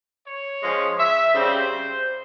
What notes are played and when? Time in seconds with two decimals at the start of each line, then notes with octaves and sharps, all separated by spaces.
0.26 C#5
0.62 F3 G#3 C#4
0.98 E5
1.34 C#3 G3 C4 C5